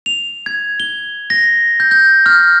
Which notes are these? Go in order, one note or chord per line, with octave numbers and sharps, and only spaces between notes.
F7
G#6
G7
A#6
G6
G6
F6